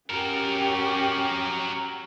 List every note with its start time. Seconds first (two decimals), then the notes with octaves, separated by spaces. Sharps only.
0.10 C#4 F#4 G4 A#4